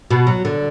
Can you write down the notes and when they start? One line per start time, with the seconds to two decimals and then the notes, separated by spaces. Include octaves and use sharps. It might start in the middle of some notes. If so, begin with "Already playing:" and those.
0.11 B2
0.27 F#3
0.45 D3